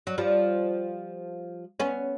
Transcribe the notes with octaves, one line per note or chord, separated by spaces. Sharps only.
F#3
F3 G3
B3 C#4